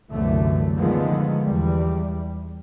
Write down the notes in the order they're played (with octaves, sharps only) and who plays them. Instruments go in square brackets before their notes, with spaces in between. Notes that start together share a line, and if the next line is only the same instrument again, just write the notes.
[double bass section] C2 F#2 B2 D3 E3 A3
D3 D#3 F3 G#3 B3
E2 G3